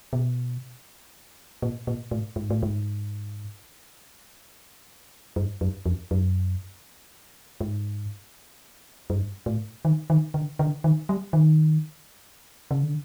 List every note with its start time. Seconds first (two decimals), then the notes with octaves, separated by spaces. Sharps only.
0.13 B2
1.62 A#2
1.87 A#2
2.11 A2
2.36 G#2
2.50 A2
2.63 G#2
5.36 G2
5.61 F#2
5.86 F2
6.11 F#2
7.61 G#2
9.10 G2
9.46 A2
9.85 D#3
10.10 D#3
10.34 D3
10.59 D3
10.84 D#3
11.09 G3
11.33 D#3
12.71 C#3
12.83 D3